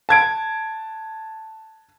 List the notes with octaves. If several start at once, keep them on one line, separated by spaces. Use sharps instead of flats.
A5 G#6 D7